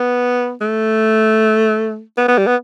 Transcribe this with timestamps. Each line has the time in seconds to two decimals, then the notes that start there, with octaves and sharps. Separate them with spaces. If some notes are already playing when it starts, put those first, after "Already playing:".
Already playing: B3
0.61 A3
2.18 B3
2.28 B3
2.38 G3
2.47 B3